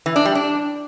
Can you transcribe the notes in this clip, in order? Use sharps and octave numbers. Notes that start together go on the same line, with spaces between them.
E3
D4
G3
D4